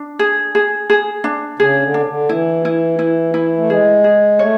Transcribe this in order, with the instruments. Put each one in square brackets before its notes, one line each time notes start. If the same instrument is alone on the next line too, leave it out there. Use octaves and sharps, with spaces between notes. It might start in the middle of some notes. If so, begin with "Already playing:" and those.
Already playing: [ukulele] D4
G#4
G#4
G#4
D4
[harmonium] C#3 [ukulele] G#4
[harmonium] D3
[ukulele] D4
[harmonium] C#3
D3
[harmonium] E3 [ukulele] E4
[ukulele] E4
E4
E4
[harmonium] A3
[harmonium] G#3 [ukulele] G#4
[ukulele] G#4
[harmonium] A3 [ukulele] C#5